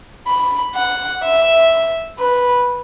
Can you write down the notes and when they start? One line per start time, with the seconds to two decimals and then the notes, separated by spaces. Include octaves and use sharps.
0.27 B5
0.75 F#5
1.23 E5
2.19 B4